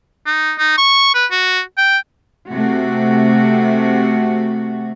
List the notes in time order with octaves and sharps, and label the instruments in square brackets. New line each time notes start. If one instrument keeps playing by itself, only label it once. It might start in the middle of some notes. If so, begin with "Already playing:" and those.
[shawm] D#4
D#4
C#6
B4
F#4
G5
[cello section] C3 A3 F#4